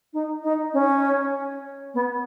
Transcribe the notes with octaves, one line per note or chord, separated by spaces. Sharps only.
D#4
D#4
C#4
B3